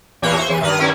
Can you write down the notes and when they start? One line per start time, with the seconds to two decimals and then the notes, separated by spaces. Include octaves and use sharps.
0.22 E2 A#2 E3 A#3 C#5 F#6
0.36 C5 E5 C#6
0.48 E2 E3 C#7 D#7
0.61 G2 D#3 B4 D#6 F6
0.79 G2 D#3 G3 C#4 E4